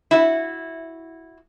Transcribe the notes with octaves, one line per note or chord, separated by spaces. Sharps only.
E4 F#4